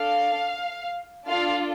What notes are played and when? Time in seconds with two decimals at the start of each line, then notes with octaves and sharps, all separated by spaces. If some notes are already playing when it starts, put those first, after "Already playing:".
Already playing: D4 A4 F5
1.26 D4 F4 A4 F5